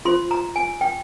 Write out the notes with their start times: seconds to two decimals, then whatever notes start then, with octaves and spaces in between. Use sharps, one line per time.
0.05 F4 C5 C6
0.31 A#5
0.56 G#5
0.81 G5